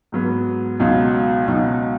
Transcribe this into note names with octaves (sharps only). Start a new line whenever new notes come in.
G#2 F#3 B3
C#2 B2 F#3 D#4
C#2 B2 F#3 D#4